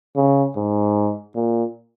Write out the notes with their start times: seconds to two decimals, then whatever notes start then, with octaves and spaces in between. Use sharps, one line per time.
0.16 C#3
0.56 G#2
1.36 A#2